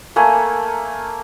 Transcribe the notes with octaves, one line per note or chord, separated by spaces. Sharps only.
A3 A#3 G#5